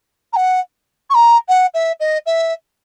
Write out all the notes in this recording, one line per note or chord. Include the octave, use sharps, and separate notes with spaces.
A#5
F#5
C#6
A#5
F#5
E5
D#5
E5